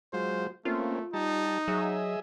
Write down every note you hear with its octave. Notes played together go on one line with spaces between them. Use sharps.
F#3 G#3 F4 C5
A3 A#3 C4 C#4 F4
G3 D#4 A5
F#3 G#4 D#5 E5